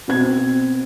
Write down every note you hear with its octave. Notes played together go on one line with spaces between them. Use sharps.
B2 C4 G#6